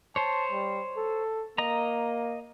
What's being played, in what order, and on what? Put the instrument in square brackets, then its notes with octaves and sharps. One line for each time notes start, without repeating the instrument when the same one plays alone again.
[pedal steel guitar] C5 C#5 [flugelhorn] A5
[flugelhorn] G3
A4
[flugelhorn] A#3 [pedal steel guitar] D#5 A#5